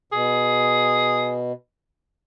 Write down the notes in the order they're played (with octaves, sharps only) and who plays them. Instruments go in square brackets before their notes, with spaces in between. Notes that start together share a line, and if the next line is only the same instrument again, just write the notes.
[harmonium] B2 [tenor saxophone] G#4